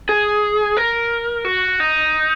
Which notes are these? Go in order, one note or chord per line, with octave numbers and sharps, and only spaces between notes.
G#4
A#4
F#4
D#4